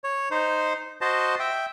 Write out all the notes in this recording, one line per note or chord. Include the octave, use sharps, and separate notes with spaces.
C#5
D#4 C5
F#4 C5 D#5 A5
E5 G5